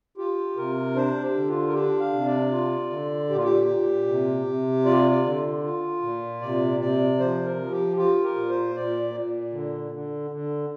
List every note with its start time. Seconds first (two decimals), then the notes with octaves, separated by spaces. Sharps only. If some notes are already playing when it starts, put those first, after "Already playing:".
0.17 F4 G4
0.57 C3 A#4
0.95 D4 C5
1.21 G4
1.34 D3
1.48 F4
1.68 A#4
1.73 D4 G4
2.00 F5
2.12 C3
2.26 D5
2.51 F4
2.90 D3
3.30 A#2 G4
3.36 F4
3.44 G4
3.68 A#2
4.08 C3
4.46 C3
4.85 F4 D5
5.12 D5
5.24 D3
5.63 F4
6.02 A#2
6.41 C3 D5
6.80 C3 D5
7.19 F3 C5
7.45 A#4
7.58 F3
7.71 G4
7.97 F4 G4
8.23 A#4
8.36 A#2
8.49 C5
8.75 A#2 D5
9.14 A#2
9.53 D3
9.92 D3
10.31 D3